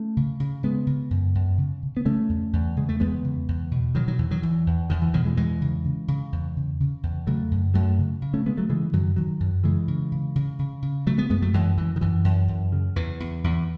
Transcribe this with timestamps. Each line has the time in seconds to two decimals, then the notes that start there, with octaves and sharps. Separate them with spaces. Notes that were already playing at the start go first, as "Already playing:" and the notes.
Already playing: A3 C#4
0.17 C#3
0.40 C#3
0.63 C#3 G#3 B3
0.87 C#3
1.10 F#2
1.35 F#2
1.58 C#3
1.83 C#3
1.97 B3
2.05 C#3 A3 C#4
2.29 E2
2.53 E2
2.76 C#3 G#3
2.89 A3
3.00 E2 G#3 B3
3.24 C#3
3.48 E2
3.71 B2
3.95 B2 D#3 F#3
4.08 D#3 F#3
4.18 E2 E3
4.31 D#3 F#3
4.42 E2 E3
4.66 E2
4.90 E2 D#3
5.02 E3
5.14 B2 D#3 F#3
5.25 E3 G#3
5.37 E2 E3 G#3
5.61 C#3
5.85 C#3
6.08 C#3
6.32 E2
6.57 C#3
6.80 C#3
7.03 E2
7.27 C#3 F#3 A3
7.51 F#2
7.74 F#2 F#3 A3
7.98 C#3
8.22 C#3
8.34 A3 C#4
8.46 C#3 G#3 B3
8.57 F#3 A3
8.69 C#3 E3 G#3
8.93 F#2 D#3 F#3
9.16 F#2 D#3 F#3
9.40 F#2
9.64 C#3 E3 G#3
9.88 C#3
10.12 C#3
10.35 C#3
10.59 C#3
10.82 C#3
11.06 C#3 F#3 A3
11.18 G#3 B3
11.30 F#2 G#3 B3
11.42 F#3 A3
11.54 F#2 E3 G#3
11.78 F#2 E3
11.96 D#3
12.01 F#2 E3
12.24 F#2
12.48 F#2
12.72 C#3
12.96 E2 E3
13.20 E2
13.44 E2